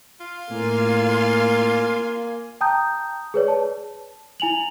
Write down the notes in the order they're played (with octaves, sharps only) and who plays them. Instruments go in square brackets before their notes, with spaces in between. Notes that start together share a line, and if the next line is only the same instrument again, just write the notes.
[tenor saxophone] F4
[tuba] A2 [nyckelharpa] A#3 G#5
[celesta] G5 A5 A#5 D#6 G6
G#4 B4 C#5 D5
A5
E4 G#5 F7 F#7